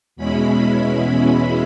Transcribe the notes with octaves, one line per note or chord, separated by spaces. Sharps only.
E2 B2 G#3 C#4 E4 B5
B5